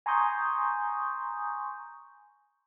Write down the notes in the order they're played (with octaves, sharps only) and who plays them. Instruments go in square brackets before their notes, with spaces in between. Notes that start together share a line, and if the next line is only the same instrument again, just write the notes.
[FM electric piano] G#5 A#5 C6 C#6 D#6 G6